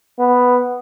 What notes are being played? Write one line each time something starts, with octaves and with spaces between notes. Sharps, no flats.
B3